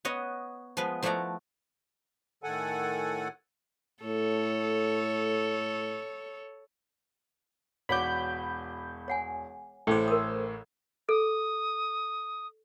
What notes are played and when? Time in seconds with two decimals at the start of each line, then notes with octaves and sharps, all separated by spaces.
0.05 B3 C#5 D#5 F#5
0.77 F3 G#3 B3 B4
1.03 F3 A3 E4 D5 F#5 A#5
2.43 A2 D#3 A4 F#5 G#5
4.03 A2 A4 C#5
7.89 E1 F#4 C#5 D5 B5 D6 G6
9.08 C#5 F#5 G#5
9.87 A1 A2 A3 G#4 A4 C5 G5
10.08 A#4 D#6
11.09 A4 D#6